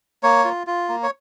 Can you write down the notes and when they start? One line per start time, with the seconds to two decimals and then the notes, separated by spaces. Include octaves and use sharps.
0.23 A#3 C#5
0.45 F4
0.67 F4
0.89 A#3
1.03 C#5